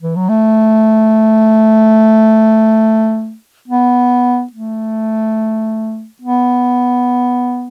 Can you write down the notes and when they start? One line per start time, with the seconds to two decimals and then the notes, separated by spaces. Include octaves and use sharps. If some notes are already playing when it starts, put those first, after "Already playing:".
0.02 E3
0.16 F#3
0.29 A3
3.68 B3
4.53 A3
6.22 B3